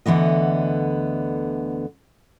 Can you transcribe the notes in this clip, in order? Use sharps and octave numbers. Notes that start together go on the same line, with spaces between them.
D2 D3 E3 B3 D#5